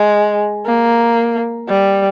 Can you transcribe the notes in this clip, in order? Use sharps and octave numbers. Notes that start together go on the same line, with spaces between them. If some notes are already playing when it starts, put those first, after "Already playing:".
Already playing: G#3
A#3
G3